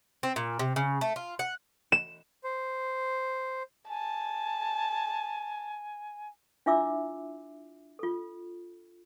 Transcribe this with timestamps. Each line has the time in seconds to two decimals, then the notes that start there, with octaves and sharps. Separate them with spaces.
0.23 C4
0.36 A#2
0.59 C3
0.76 C#3
1.01 A3
1.16 F4
1.39 F#5
1.92 E7
2.44 C5
3.89 G#5 A5
6.66 D4 E4 F4 E5 D6 E6
7.99 F4 A4